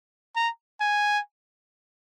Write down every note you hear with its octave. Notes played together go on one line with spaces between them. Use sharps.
A#5
G#5